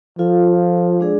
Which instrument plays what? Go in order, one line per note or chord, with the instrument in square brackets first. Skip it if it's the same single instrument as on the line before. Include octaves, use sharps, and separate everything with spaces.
[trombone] F3 [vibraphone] F4 A4 F5
[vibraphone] G#3 D4 G#4 D5